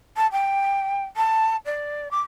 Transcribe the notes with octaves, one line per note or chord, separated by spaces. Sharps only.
A5
G5
A5
D5
D6